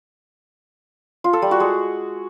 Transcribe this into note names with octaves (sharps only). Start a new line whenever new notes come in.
F4
A4
G3
F#4
G#3